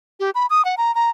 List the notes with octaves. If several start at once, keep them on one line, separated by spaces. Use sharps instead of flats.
G4
B5
D#6
F#5
A#5
A#5